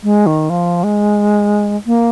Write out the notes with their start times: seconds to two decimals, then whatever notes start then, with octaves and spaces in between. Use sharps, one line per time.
0.03 G#3
0.26 D#3
0.50 F3
0.84 G#3
1.86 A#3